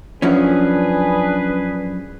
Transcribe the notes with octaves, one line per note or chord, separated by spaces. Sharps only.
F#2 F3 C#4 D4 G#4 B4